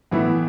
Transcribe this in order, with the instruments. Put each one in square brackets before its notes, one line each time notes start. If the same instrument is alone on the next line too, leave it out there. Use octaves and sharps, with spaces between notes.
[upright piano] A2 E3 B3 E4